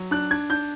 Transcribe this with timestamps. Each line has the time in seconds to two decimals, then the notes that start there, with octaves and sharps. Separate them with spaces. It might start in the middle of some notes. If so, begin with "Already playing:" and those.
Already playing: F#3
0.11 D4 F#6
0.31 D4 G#6
0.50 D4 G6